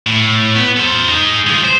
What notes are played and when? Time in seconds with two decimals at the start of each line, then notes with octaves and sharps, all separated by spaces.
0.07 A2
0.55 B3
0.77 A4 C5
1.08 D#4 G#4
1.47 G#3 F4
1.64 C5